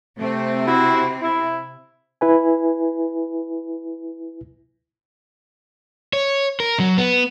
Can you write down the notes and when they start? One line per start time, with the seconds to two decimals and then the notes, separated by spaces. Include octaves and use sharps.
0.19 C3 A3 C4
0.66 E4 F#4
1.21 E4
2.21 E4 B4 G#5
6.13 C#5
6.60 A#4
6.80 F#3
6.98 B3